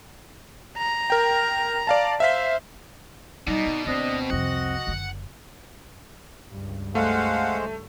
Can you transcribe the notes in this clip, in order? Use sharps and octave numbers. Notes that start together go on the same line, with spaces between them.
A#5
A#4 G5
D5 F5 A5
C5 E5 F5 B6
B2 G3 D#4 D5
C4
D2 A3 C4 D4 D#5
C2 F2 F#4 D#5 F#5
F#1 D3
C#2 G2
G#3 A3 C5 F5 F#5